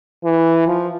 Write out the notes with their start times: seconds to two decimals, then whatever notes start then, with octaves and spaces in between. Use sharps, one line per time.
0.24 E3
0.67 F3